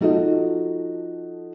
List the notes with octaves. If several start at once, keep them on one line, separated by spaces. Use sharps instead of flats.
F3 D#4 F#4 A4 D#5